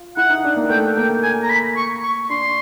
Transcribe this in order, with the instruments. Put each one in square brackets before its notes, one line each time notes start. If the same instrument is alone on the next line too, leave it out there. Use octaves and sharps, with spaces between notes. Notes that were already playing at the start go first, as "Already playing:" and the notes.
Already playing: [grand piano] F4
[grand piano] E4 [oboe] F#5
[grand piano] D#4
D4
A#3
[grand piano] A3 [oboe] G5
[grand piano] A#3 [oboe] G5
[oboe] G#5
A#5
B5
C#6
C#6
[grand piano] D4 [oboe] C6